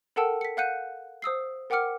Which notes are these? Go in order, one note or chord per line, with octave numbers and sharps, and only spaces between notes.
A4 A#4 F#5 G5 A5 E6
B6 C#7
F5 F#5 F#6 G6 C#7 D#7
C5 D#6 E6 C7
A#4 F#5 G5 D6 F6 C#7